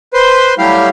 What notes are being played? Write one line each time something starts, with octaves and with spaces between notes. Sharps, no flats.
B4 C5 C6
F#3 G3 A3 E4 G4 F5